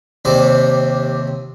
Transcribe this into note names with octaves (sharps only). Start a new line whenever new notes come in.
D#2 C3 C4 C5 D5